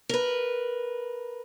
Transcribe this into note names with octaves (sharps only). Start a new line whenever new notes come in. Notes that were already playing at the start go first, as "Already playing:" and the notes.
A#4 B4